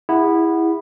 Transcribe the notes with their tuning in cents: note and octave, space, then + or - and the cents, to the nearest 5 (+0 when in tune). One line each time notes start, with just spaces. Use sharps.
E4 -5 G#4 -35 F#5 +0